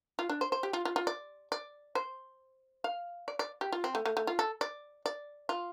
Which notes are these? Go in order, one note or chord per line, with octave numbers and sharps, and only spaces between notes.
F4
D4
C5
C5
G4
F4
F4
F4
D5
D5
C5
F5
D5
D5
G4
F4
C4
A3
A3
A3
F4
A4
D5
D5
F4